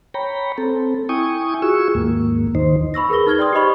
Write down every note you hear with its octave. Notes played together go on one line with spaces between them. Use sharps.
C#5 G5 A#5 B5
C4 A4
E4 G5 G#5 C#6 D#6
F4 F#4 G#4 C#6 E6
D#2 G#2 A#3
D#2 D#3 D#4 C5
B5 C#6 E6 A#6
G#4 A#4 B4 A#6 G7
D#4 F6 G#6 G7
D5 G5 C6 D#6
G4 C5 D#5 B5 C#6